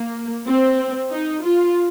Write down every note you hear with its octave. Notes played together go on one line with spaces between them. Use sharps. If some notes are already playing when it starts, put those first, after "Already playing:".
Already playing: A#3
C4
D#4
F4